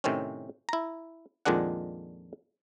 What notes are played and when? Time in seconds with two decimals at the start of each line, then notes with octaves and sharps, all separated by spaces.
0.04 A2 C3 D#3 C4 C#4
0.69 E4 A#5
1.45 F2 A#2 D#3 G#3 D4 F#5